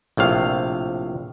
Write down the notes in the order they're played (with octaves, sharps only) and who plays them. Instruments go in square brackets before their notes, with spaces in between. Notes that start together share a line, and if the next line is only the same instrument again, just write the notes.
[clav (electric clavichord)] A#1 A2 C3 F5